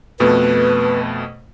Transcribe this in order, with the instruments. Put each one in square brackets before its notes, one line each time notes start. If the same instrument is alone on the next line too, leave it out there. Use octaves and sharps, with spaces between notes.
[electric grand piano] F2 B2 A3 [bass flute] B4